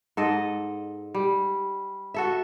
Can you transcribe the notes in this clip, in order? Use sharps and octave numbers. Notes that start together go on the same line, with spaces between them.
G#2 A4 D#5
G3
F#4 A4 E5